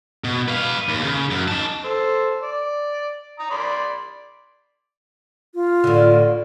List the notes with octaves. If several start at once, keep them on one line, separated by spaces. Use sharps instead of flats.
B2
B4 F5
D#2
C#3
F#2
D#4 A5
A4 C5
D5
A#5 D#6
D5 B5 C6
F4
A2 D3